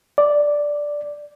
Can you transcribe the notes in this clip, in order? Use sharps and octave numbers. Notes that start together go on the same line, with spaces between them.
D5